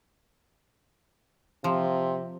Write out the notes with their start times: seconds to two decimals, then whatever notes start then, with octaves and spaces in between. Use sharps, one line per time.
1.64 C3 F3